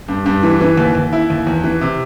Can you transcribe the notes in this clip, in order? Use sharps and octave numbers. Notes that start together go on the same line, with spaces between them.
G2
G2
E3
E3
D#2
D#2
E4
D#2
E2
E3
C3